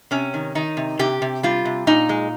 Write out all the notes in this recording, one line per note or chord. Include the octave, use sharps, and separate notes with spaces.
C3 C#4
D#3
D#3 D#4
C3
C3 G4
C3
G3 F4
C3
A#2 D#4
G#3